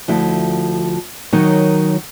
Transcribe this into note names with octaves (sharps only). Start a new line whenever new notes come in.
D2 F3 E4
D#3 F#3 D#4 A#4 C#5